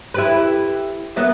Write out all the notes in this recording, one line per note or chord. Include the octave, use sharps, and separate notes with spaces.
E4 G4 B4
A#3 B3 E5